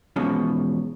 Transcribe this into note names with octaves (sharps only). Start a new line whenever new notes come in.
E2 G#2 B2 F3 C#4